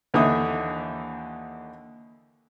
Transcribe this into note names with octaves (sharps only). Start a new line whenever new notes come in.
D#2 D3 E3 D#4 E5 D#6